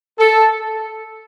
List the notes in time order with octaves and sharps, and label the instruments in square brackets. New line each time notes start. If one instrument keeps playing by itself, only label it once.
[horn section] A4